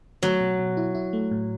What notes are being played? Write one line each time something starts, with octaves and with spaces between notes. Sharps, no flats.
F#3 A3
B2
B2
E4
E4
A3
A2